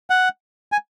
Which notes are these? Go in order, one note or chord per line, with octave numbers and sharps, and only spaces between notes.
F#5
G#5